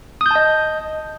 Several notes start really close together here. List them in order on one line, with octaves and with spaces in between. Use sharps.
D#6 G6 A5 D#5